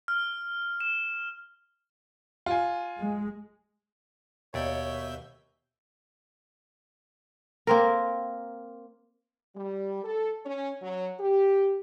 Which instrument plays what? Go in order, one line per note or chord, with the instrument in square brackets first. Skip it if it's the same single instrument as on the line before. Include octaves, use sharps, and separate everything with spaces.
[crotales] F6
E7
[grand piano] F4 G#5
[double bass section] G#3
[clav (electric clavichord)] D#2 D5 [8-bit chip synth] B2 E5 G6 [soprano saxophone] C#5
[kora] A#3 C4 A#4
[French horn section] G3
A4
C#4
F#3
G4